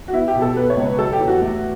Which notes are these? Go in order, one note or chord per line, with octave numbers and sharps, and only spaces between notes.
F#4
B3 E4
G4
B2
A4
B3 B4
C#5
C#2
B4
F#3 A4
G4
E2
F#4
A3